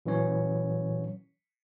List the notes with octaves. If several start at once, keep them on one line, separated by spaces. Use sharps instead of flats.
A#2 E3 F#3 C#4 C#5